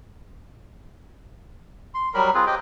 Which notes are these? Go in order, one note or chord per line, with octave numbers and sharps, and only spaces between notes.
C6
F#3 G3 A#4 B5
C4 F4 G#4 B4
G4 C5 D#5 G5